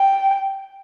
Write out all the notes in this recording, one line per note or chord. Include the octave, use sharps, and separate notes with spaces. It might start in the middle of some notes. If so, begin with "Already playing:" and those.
Already playing: G5